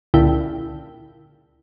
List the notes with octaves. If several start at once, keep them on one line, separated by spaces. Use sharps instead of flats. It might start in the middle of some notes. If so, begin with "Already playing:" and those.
C#2 A#2 D3 E4 G5